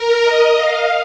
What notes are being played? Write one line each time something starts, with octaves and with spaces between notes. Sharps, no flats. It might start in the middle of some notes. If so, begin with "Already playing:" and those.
Already playing: A#4
D#5
F5